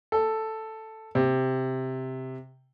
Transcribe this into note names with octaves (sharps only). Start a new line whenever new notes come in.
A4
C3